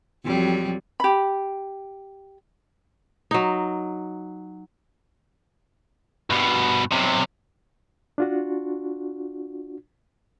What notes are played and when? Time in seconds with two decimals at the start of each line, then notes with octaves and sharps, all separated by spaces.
0.24 F2 F#3 G3
1.00 G4 B5
3.31 F#3 D#4
6.30 G2 B2
6.91 B1 C3
8.18 D4 F4 F#4